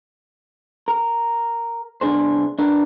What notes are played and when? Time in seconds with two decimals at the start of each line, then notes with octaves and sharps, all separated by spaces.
0.88 A#4
2.01 C2 B3 D4 G#4 C5
2.59 D4 A#4 B4